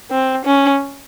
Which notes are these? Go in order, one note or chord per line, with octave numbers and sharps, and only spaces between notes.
C4
C#4